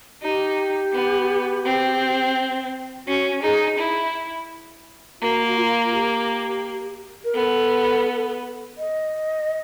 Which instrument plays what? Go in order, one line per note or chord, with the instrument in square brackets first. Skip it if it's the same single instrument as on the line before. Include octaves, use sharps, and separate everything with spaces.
[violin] D#4 [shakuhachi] G4
[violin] B3
C4
[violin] C#4 [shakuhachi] F#4
[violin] D#4 [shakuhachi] G#4
[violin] E4
[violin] A#3 [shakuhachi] F#4
[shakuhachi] F#4
F4
G4
A#4
[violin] B3 [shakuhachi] A4
[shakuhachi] D#5